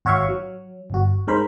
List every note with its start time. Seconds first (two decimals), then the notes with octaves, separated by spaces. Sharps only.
0.05 G#1 F#4 C#5 E5 F5 C#6
0.29 F#3
0.90 G1 F#4
1.27 G#2 G#3 A#4 C5 B5